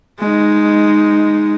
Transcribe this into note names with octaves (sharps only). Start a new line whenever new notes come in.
G#3 D#4